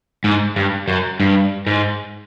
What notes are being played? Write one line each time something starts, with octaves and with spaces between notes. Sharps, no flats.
G#2
G2
F#2
G2
G#2